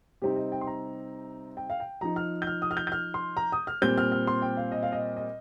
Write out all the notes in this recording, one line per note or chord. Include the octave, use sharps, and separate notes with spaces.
C3 G3 C4 D#4 G4
D#5
G5
C6
A#5
G5
F5
G5
F3 D#4 A#5
F6
G6
F6
D#6
F6
G6
G6
F6
C6
A#5
D#6
F6
A#2 G3 C4 G6
F6
F6
C6
G5
F5
D#5
F5
D#5
D#5